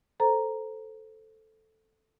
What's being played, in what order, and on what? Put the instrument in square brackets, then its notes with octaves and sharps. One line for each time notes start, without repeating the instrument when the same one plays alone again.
[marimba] A4 C5 A#5